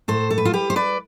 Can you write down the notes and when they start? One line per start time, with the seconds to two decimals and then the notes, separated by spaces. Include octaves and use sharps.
0.08 A2 A4 C5
0.31 A4
0.38 B4
0.45 F4 A4
0.53 G3 G4 B4
0.70 C5
0.76 B4 D5